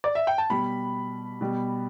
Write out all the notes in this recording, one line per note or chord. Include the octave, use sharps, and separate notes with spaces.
D5
E5
G5
A5
B2 G3 B5
B2 G3